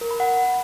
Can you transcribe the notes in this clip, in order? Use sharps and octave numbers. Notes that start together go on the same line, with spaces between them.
A#4
B5
F#5